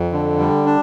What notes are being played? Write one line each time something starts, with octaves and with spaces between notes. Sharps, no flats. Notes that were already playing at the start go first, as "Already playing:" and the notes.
Already playing: F2
D3
G3
D4